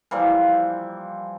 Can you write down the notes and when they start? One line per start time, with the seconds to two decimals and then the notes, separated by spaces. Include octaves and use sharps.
0.11 E3 F3 G3 A#3